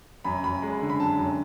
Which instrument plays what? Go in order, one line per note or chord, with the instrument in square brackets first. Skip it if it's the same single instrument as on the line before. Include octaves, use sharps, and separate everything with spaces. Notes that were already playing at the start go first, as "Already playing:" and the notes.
[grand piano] F#2 B5
F#2 B5
G#3
D3
B5
F#2 A5
F#2